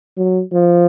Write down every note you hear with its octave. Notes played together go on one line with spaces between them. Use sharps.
F#3
F3